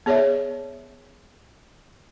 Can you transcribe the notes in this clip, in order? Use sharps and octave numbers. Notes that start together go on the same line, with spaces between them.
B3 G#4 C#5 D5 E5